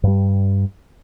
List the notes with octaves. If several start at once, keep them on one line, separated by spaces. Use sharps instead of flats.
G2 G3